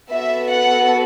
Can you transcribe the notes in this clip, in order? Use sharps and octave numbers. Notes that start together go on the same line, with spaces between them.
B3 F#4 A4 E5
F#5